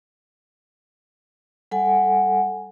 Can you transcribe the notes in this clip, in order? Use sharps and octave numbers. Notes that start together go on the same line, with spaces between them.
G3 A4 F#5 G#5